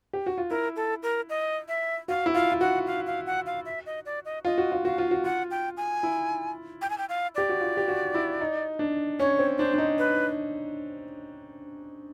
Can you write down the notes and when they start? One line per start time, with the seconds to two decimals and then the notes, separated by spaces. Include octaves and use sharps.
0.13 G4
0.26 F#4
0.38 F4
0.50 E4 A#4
0.76 A4
1.03 A#4
1.29 D#5
1.68 E5
2.08 F#4 F5
2.26 E4
2.34 F4 F5
2.52 F4
2.61 F#4 F#5
2.87 F5
3.07 F5
3.27 F#5
3.46 F5
3.66 E5
3.86 D#5
4.06 D5
4.25 D#5
4.45 F4 D#5
4.58 F#4
4.72 F4
4.85 F#4 F5
4.98 F4
5.11 F#4
5.24 F4 F#5
5.51 G5
5.77 G#5
6.03 E4
6.82 G5
6.90 G#5
6.98 G5
7.09 F5
7.35 G4 D5
7.49 F#4
7.61 F4
7.77 G4
7.88 F#4
8.14 E4
8.41 D#4
8.79 D4
9.19 C#4 C#5
9.39 C4
9.58 D4 C5
9.74 D4
9.78 D#4
9.98 B4